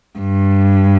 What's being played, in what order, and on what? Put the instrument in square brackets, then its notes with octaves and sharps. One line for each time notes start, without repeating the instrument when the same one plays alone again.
[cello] G2